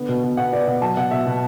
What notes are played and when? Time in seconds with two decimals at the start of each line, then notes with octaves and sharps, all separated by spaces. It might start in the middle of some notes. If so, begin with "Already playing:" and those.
Already playing: D3 B3
0.09 B2
0.24 B2
0.37 B3 F#5
0.52 B3 D5
0.67 B2 F#5
0.82 F#3 A5
0.97 B2 F#5
1.11 B2 E5
1.27 B2